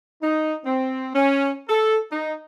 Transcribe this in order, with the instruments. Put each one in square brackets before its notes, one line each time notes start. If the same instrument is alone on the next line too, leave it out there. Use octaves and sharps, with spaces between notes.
[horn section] D#4
C4
C#4
A4
D#4